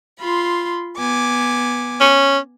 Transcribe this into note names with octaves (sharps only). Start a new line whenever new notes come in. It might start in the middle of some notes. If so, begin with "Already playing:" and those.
F4 B5 C6
B3 G#5 D6
C#4